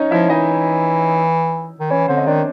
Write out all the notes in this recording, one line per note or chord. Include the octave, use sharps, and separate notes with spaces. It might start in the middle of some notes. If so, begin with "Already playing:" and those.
Already playing: C#4 D#4 C#5 D#5
F3 E4 E5
E3 D#4 D#5
D#3
E3 C#4 C#5
D3 C4 C5
D#5
D#3 D4 D5